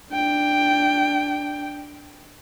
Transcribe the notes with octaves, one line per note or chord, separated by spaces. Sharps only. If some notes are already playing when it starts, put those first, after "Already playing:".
D4 G5